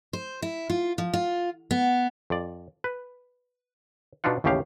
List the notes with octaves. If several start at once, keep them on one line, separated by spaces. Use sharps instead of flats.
C5
E4
F4
F3
F4
B3
F2 D5
B4
B2 B3 D4 D#4 F4 F#5
A1 D#2 A2 C#3 G4 F5